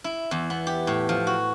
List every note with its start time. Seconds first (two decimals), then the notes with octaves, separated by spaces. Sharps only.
0.04 E4
0.31 E2
0.50 B3
0.67 G4
0.87 A2
1.09 F3
1.27 F#4